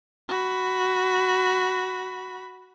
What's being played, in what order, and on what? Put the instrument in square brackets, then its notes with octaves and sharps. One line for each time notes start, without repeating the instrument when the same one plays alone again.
[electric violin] F#4 B5